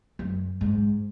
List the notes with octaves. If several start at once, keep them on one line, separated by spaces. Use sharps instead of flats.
F#2
G#2